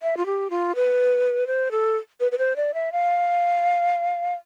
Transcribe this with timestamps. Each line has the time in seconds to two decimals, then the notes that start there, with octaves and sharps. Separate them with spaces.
0.03 E5
0.17 F4
0.26 G4
0.50 F4
0.75 B4
1.47 C5
1.71 A4
2.20 B4
2.32 B4
2.38 C5
2.56 D5
2.74 E5
2.92 F5